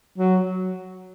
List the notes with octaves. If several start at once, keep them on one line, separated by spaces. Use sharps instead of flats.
F#3